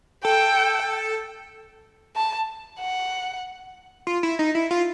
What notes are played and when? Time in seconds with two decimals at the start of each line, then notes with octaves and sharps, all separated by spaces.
0.25 A4 G5
2.16 A5
2.79 F#5
4.07 F4
4.23 E4
4.39 D#4
4.55 E4
4.71 F4